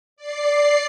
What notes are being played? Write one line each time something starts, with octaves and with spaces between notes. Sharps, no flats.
D5 C7